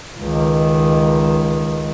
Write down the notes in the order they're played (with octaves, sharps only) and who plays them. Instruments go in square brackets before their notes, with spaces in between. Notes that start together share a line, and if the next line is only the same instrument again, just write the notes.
[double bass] C#2 D#3